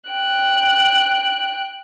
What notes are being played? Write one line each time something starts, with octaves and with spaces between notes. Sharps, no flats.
G5 F#6